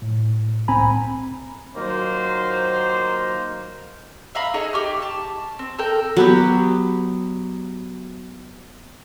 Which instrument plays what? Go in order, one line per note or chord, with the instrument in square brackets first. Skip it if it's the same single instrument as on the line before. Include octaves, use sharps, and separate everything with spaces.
[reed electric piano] A2
C2 A2 C4 G#5 A#5 B5
[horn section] D#3 F#3 A#3 F4 C5
[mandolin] E5 F5 A#5 B5
D#4 G#4 A4 C#5
G4 C#6 F6
A5
C4
A4 A#4 G5
[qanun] F#3 B3 G4